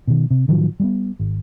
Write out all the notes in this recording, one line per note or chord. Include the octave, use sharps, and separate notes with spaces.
B2 D#3
C3
A2 D#3 F3 F#3
G3 G#3 B3
G#1